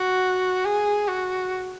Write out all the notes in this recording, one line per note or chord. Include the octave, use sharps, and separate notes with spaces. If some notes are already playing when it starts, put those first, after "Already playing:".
Already playing: F#4
G#4
F#4